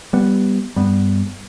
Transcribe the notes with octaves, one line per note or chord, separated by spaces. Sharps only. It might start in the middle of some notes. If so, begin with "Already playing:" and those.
G3 B3
G2 G3 B3